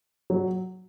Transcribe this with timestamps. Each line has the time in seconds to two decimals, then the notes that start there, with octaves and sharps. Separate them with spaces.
0.30 F#3